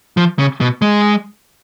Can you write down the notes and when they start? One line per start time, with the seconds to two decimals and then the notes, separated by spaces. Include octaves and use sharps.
0.17 F3
0.39 C#3
0.61 B2
0.82 G#3